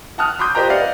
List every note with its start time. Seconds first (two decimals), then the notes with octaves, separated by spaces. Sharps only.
0.18 F#5 A5 D#6 F6 F#6
0.39 B5 C6 D6 D#6 G6
0.55 F4 G4 C5 D#5 G5 A#5
0.69 B4 D5 D#5 F5 F#5